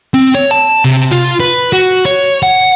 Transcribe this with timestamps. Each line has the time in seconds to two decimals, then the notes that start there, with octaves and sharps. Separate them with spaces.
0.14 C4
0.35 C#5
0.51 A5
0.85 C3
1.11 F4
1.40 B4
1.73 F#4
2.06 C#5
2.43 F#5